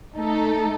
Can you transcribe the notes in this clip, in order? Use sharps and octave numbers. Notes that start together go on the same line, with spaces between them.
A3 D#4 A4